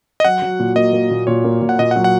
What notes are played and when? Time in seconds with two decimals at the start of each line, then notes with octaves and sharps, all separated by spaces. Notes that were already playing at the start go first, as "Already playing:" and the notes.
0.20 D#5
0.25 F#3 F#5
0.42 F#3
0.59 A#2
0.76 A#3 D#5
0.93 A#3
1.10 A#2
1.27 A#2 C#5
1.44 A#3
1.61 A#2
1.69 F#5
1.79 A#2 D#5
1.91 F#5
1.96 F#3
2.04 F#5